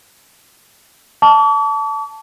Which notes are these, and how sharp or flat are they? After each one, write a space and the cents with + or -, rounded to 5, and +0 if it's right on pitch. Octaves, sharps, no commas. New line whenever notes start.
A5 +0 D6 -45